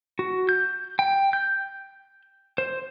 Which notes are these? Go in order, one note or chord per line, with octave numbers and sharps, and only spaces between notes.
F#4
G6
G5
G6
C5